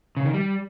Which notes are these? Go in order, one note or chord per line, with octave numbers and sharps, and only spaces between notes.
C#3
D#3
G3